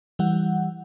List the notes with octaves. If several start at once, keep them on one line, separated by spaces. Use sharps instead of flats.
E3 G3 F#5